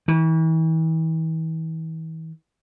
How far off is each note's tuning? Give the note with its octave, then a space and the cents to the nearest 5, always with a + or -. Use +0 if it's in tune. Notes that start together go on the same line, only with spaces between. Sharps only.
E3 -40